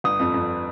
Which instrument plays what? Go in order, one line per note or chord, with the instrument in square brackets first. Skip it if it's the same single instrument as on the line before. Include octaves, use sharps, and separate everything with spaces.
[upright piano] G1 [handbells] D#6
[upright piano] F2
F2